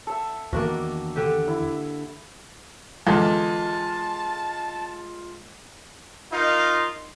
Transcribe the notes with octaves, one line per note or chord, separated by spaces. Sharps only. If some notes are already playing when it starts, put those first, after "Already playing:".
A4 E5
E2 D#3 A#3 D4 F#4
D3 G4
E4
E2 D3 G#3 F4 A5
D#4 F4 A#4 F5